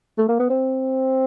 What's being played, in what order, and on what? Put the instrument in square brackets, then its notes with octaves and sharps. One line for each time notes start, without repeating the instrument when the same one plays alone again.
[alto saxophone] A3
A#3
B3
C4